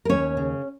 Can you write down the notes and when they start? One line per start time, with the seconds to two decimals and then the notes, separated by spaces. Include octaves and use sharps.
0.05 A#4
0.09 D#2 C#4 C#5
0.37 C#3